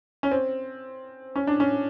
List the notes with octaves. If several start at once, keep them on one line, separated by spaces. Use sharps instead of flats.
C#4
C4
C#4
D4
C#4